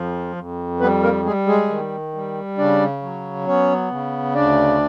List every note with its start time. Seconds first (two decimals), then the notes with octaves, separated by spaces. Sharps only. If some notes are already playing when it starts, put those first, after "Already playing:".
Already playing: F2 F3
0.36 F2
0.80 G3 B3 B4
1.03 A#3 A#4
1.25 G3 G#3 G#4
1.47 G#3 G#4
1.69 D#3
2.14 G3
2.57 C#3 D4 D5
3.02 F#3
3.46 B3 C#4 C#5
3.91 C#3
4.35 D2 D4 D5